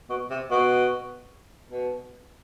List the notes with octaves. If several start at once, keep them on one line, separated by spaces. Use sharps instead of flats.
B2
C3
B2
B2